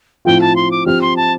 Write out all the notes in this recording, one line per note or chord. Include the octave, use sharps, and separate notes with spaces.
A2 F3 C4 F4 G5
A5
C6
D6
F3 C4 G4 F6
C6
A5